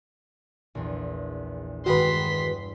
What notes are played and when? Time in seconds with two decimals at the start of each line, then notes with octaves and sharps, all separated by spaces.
0.75 A#1 E2
1.86 E1 G2 D#3 G#3 F#4 B4 C6 B6